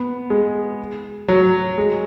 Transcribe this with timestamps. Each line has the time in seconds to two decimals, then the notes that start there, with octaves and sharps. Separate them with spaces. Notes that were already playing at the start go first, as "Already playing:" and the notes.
Already playing: B3
0.30 G#3
1.28 F#3
1.78 G#3